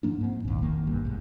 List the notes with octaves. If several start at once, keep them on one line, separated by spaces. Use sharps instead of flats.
G#2 F3 A#3 D4
G#2 C4
A#1 D#2
G#1 F2 D#3 A#3
B1 G2
B1 G#2